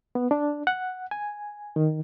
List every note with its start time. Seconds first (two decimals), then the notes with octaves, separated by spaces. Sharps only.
0.15 B3
0.31 D4
0.67 F#5
1.11 G#5
1.76 D#3